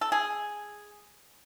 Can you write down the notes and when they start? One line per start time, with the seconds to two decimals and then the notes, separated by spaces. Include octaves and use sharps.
0.01 A4
0.12 G#4